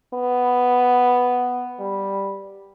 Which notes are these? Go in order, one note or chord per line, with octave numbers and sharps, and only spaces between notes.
B3
G3